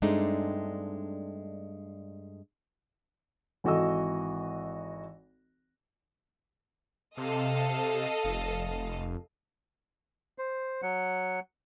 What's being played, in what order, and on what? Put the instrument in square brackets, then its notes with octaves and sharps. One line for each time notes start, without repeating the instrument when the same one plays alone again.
[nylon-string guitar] G2 G#3 A3 C4 D4 D#4
[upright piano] G#1 E3 F#4 A4 D#5 E6
[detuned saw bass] C3 [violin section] A4 D#5 F5
[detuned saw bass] F1
[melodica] C5
F#3 F#5